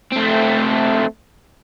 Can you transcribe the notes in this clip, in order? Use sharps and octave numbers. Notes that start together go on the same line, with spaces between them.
A3 C4